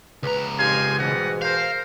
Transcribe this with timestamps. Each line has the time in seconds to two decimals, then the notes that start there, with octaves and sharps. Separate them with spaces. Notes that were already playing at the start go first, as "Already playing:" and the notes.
0.23 C#2 B4 A#5
0.59 F2 D#4 G4 F5 G#5 C6
0.99 G#2 B2 E3 G3 D#5 F#5
1.42 A#4 C5 F5